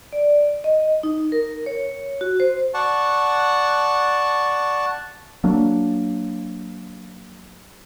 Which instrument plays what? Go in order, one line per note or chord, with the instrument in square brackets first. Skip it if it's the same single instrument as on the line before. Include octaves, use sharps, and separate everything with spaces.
[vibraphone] D5
D#5
D#4
A#4
C#5
F#4
C5
[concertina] D5 F#5 A5 C#6
[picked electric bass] F#3 A#3 D4